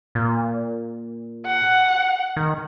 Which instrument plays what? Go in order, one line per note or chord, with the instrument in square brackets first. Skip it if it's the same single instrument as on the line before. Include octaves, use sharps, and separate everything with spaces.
[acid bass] A#2
[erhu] F#5
[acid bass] D#3